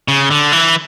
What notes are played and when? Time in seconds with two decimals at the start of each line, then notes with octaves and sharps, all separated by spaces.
0.08 C#3
0.31 D3
0.52 E3